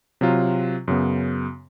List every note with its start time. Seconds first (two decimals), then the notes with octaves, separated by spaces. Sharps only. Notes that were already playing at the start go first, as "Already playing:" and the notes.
0.21 C3 F#3 F4
0.88 F#2 C#3 B3